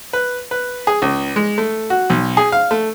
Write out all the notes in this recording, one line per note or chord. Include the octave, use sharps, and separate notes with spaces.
B4
B4
G#4
C#2
G#3
A3
F#4
B1
G#4
F5
A3